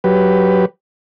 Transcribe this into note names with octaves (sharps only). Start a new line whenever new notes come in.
F#3 G4 B4